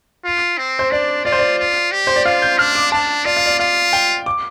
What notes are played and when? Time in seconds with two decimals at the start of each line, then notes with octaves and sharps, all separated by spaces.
0.25 F4
0.58 C4
0.79 C5
0.91 D4 D5
1.25 F4 D5
1.32 C5
1.39 D5
1.58 F4
1.92 G4
2.07 C5
2.16 D5
2.25 F4 F5
2.42 G6
2.58 D4 F6
2.75 D6
2.92 D4 A5
3.25 F4 D5
3.37 F5
3.46 D5
3.59 F4 F5
3.93 G5
4.26 D6